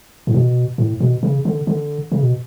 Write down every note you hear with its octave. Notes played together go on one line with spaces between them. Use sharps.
A2
B2
A2
B2
C#3
D3
D3
C#3
B2